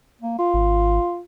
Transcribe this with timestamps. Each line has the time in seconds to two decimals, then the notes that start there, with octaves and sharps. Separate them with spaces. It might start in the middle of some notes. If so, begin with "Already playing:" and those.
0.22 A#3
0.38 F4
0.54 G#1